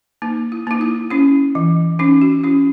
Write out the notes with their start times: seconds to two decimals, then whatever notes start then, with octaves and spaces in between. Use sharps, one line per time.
0.22 A#3 D#4
0.52 E4
0.67 A#3 D#4
0.81 E4
1.11 C#4 E4
1.55 E3
1.99 C#4 D#4
2.22 F#4
2.44 C#4 E4